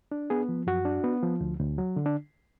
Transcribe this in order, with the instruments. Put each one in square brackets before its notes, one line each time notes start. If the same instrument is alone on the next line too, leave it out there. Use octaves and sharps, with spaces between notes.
[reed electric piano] D4
B3 G#4
F3
F#2 F#4
D4
B3
F3
D2
D2
F#3
D3
D4